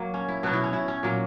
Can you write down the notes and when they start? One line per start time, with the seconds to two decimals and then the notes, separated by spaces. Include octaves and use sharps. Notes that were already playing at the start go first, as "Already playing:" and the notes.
Already playing: F#3 A#3
0.14 C#4
0.28 E4
0.43 B2 F#3 B3 F#4
0.53 E4
0.64 C#4
0.73 E4
0.88 C#4
1.03 A#2 F#3 A#3